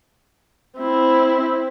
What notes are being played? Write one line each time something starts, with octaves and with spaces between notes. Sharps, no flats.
C4 E4